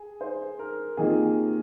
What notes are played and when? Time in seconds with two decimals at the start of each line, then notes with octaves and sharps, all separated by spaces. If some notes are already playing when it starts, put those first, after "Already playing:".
Already playing: G#4
0.21 C5
0.59 A#4
0.97 C3 D#3 A#3 F4 G#4